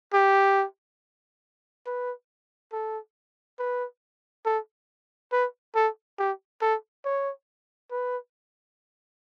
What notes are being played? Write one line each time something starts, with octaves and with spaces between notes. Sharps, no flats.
G4
B4
A4
B4
A4
B4
A4
G4
A4
C#5
B4